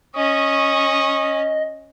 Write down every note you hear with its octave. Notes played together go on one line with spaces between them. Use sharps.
C#4 D#5 C#6 D#6